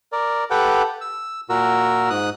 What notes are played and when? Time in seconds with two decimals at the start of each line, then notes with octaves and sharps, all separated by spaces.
0.12 A#4 D5
0.51 G4 A4 B4 F#5 G5
1.01 E6
1.49 A#2 F#4 A#4 E6
2.10 G#2 D#6 F#6